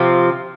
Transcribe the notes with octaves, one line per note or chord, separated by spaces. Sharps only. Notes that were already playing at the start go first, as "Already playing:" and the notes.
Already playing: C3 F3 C4 F4